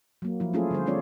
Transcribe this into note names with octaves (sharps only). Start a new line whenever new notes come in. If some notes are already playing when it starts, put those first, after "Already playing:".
F#3 A#3
F3 E4
A3 C#4 E4 F4 G#4 A4
D3 G3 C5
G#3 B3 C#4 F4 C#5 D5